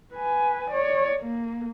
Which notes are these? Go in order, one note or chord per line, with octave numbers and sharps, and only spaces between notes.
B4 G#5
C#5 D5
A#3